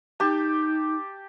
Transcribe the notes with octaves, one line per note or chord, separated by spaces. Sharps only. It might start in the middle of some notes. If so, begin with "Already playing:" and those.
D#4 G4 A5